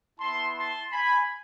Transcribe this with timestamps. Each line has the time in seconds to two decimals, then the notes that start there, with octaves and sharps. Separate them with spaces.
0.20 B3 E4 A5 C6
0.56 A5 C6
0.92 G#5 B5